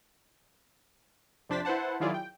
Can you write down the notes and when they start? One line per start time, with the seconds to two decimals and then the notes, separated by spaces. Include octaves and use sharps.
1.49 F2 C3 D4 C5 A6 B6
1.65 E4 B4 C5 F#5 A5
2.00 D#3 F#3 E4 F4 G#4 D5
2.14 G5